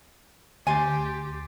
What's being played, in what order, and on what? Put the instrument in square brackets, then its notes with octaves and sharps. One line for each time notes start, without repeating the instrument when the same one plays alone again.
[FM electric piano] D2 C6 A6 [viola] G4 [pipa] G#5